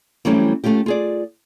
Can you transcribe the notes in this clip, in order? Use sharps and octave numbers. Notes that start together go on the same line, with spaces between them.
E3 F#3 G3 A3 C4 C#4
A3 C#4 F4 G4
F4 G#4 D5